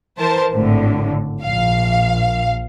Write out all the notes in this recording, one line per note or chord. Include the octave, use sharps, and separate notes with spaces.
E3 A#4 C5 A5
G#1 A2 D3
A#1 F5